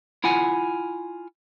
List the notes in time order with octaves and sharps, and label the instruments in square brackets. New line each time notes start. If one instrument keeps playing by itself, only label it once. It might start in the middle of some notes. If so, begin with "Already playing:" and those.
[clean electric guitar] E4 F4 F#5 G#5